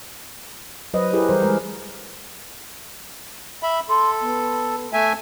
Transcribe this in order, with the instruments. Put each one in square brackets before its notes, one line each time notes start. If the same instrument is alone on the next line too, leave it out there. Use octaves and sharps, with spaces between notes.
[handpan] F#3 B4 C5 D#5
E4 G4 G#4 A#4 B4
E3 G3 A#4 C5
G#3 G#4 A#4
[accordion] E5 B5
[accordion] A4 [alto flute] C6
[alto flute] B3
[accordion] A3 E5 G#5